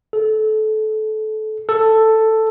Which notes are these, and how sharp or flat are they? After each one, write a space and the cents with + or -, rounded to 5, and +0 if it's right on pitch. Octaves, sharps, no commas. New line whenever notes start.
A4 -25
A4 +5